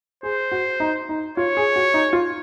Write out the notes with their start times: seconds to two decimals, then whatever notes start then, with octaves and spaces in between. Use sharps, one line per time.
0.23 G#4 C5
0.52 F#4
0.80 D#4
1.09 D#4
1.37 F4 C#5
1.57 G#4
1.76 F#4
1.94 D#4
2.13 F4